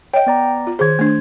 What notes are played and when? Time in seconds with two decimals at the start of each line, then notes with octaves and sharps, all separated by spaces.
0.14 C#5 D#5 G5
0.27 B3 D5 A#5
0.67 F4
0.79 D#3 G#4 C5 G#6
0.99 A3 D4